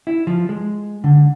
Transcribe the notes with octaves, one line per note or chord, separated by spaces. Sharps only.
E4
F3
G#3
D3